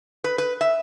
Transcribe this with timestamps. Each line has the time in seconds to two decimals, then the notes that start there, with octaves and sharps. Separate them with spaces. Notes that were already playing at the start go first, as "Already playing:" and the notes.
0.24 B4
0.38 B4
0.61 E5